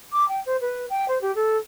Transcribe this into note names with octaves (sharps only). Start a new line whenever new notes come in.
D6
G5
C5
B4
G5
C5
G4
A4